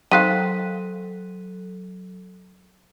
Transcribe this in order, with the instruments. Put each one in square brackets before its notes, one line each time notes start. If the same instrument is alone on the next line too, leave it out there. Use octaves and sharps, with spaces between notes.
[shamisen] D#3 C4 F5 [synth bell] F#3 A4 [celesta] F#6 B6 D#7